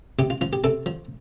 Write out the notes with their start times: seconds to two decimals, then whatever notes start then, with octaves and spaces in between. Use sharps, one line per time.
0.19 C3 G4
0.30 F4
0.41 F3 F4
0.53 G4
0.64 C3 A4
0.86 F3